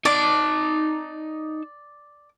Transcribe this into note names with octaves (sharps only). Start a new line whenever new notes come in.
D#4 D5 A5 D6